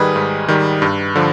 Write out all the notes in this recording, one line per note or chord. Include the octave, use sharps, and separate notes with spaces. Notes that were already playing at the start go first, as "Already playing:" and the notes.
Already playing: G#2 D#3 G3 G#4 B4
G#2
D#3 G3
G2
D3 F3